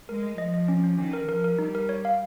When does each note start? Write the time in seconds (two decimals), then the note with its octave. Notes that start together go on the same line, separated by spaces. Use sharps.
0.09 G#3 A#4
0.23 D#5
0.38 F3 D#5
0.54 D#5
0.68 C#4
0.84 C#4
0.98 D#3 C#4
1.13 A#4
1.29 F3 A#4
1.44 A#4
1.59 G3 D#4
1.75 A#4
1.89 C#5
2.05 F5